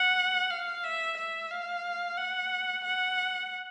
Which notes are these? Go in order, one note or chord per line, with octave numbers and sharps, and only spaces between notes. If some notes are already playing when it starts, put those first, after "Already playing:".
Already playing: F#5
F5
E5
E5
F5
F#5
F#5